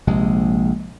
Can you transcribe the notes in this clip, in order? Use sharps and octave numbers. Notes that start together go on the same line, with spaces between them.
A#1 C3 G#3